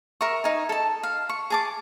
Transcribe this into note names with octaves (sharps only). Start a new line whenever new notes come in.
A#4 E5 C#6
D#4 G#5
A4 A5
F5
C#6
G#4 A5 D6